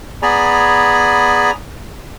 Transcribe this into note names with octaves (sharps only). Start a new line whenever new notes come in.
B3 G#4 D5 G#5 A#5 B5